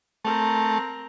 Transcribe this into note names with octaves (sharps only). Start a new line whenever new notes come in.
A3 C4 A#4